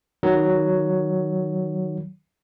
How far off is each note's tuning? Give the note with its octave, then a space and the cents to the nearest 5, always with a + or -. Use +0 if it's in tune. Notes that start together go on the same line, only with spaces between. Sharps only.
D#3 +0 F#3 +5